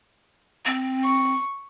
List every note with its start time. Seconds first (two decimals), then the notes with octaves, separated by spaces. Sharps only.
0.66 C4
1.03 C#6